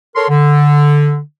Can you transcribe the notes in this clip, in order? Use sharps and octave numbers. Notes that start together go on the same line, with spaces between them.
A4 A#4 C#5 C6
D3